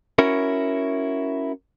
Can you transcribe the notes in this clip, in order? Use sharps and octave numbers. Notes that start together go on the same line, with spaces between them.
C#4 E4 F#4 A#4